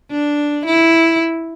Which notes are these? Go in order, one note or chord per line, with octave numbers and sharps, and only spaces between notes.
D4
E4